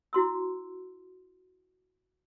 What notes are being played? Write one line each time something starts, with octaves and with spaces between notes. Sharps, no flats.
E4 F#4 C6 E6